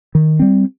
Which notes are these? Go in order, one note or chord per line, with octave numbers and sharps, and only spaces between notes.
D#3
G3 C4